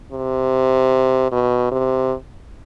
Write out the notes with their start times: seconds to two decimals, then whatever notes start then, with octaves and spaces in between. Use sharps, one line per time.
0.12 C3
1.31 B2
1.72 C3